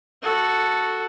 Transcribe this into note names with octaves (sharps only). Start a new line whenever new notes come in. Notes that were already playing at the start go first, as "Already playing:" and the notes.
F#4 A4